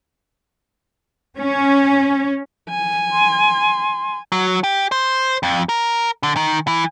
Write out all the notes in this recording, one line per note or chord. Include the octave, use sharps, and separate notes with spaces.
C#4
G#5
C6
F#3
G4
C5
F2
A#4
D3
D#3
E3